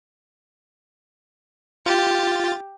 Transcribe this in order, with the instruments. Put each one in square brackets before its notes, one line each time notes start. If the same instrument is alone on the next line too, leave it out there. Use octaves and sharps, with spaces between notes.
[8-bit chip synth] F4 A6 [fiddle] G4